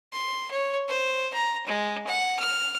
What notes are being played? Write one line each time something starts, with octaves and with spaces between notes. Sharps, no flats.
C6
C#5
C5
A#5
G#3
F#5
F6